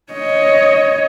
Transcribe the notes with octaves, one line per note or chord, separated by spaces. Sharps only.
C#5 D#5